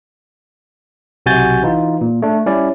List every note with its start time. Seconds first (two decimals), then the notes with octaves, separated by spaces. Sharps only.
1.26 B1 C3 F#4 G#5 G6 A6
1.63 E3 D#4 F4
2.01 A#2
2.22 A3 D4
2.46 G3 C#4 E4 D5